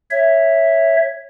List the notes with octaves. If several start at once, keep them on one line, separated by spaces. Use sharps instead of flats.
C#5 E5